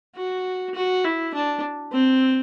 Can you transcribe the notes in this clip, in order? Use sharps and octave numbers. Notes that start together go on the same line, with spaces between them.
F#4
F#4
E4
D4
C4